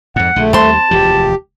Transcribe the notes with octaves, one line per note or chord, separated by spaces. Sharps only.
F2 G#2 F#5
A#1 D3 A3
D#2 G3 C4 A5 C6
E1 D2 F3 G4